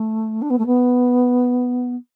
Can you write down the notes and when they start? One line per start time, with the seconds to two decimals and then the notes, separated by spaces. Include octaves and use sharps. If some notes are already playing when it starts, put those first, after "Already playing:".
Already playing: A3
0.42 D4
0.50 B3
0.58 A3
0.66 B3